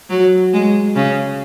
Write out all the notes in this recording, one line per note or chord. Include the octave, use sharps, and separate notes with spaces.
F#3
G#3
C#3